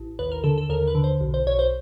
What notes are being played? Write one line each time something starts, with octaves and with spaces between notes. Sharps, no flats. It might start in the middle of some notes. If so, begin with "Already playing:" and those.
Already playing: A1
D#2 B4
A#4
D3 A4
A4
D#2 A#4
B4
D3
C5
B1
C5
B1 C#5
C5